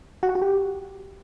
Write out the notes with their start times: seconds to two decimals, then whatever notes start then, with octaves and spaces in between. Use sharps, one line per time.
0.23 F#4
0.29 F#5
0.35 F#4
0.42 G4